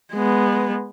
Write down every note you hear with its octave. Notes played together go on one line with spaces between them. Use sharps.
G#3 B3